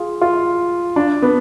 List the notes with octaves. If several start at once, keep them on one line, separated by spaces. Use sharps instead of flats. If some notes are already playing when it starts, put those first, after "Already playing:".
Already playing: F4 G#4
F4
D4
B3